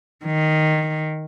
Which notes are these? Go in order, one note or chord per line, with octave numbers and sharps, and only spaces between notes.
D#3